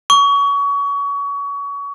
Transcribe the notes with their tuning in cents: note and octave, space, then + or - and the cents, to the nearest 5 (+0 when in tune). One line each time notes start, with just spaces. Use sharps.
C#6 +30